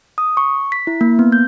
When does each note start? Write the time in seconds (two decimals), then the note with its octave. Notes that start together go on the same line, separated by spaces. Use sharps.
0.18 D#6
0.37 C#6
0.72 B6
0.87 E4
1.01 A#3
1.19 B3
1.32 G6